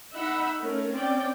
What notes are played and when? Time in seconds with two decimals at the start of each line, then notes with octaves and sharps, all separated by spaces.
0.13 D#4 E5 F#5 B5
0.61 A3 C#4 A#4
0.92 C4 C#4 D5 G5